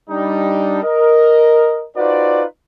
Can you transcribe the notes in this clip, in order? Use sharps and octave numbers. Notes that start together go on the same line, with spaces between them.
G3 D4 D#4
A#4 D#5
D#4 F4 F#4 B4 C5 D5